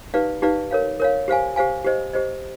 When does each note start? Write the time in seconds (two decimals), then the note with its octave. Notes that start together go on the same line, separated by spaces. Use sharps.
0.14 D#4 G4 B4 D5 F5
0.42 D#4 G4 B4 D5 F5
0.71 A#4 C#5 F5
1.00 A#4 C#5 F5
1.28 G4 C5 F5 G#5
1.56 G4 C5 F5 G#5
1.84 G4 C5 D#5
2.13 G4 C5 D#5